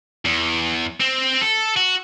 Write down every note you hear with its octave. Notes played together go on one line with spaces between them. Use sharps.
E2
C4
A4
F#4